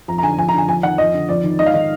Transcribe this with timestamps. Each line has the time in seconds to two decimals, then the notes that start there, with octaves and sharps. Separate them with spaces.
0.08 F2 A#5
0.18 A#5
0.23 D3 G#5
0.38 F2 G#5
0.49 A#5
0.53 D3 G#5
0.68 F2 G#5
0.83 D#3 F#5
0.98 F2 D#5
1.14 D3
1.29 F2 D5
1.44 D#3
1.59 G#2 D#5
1.66 F5
1.74 D#3 D#5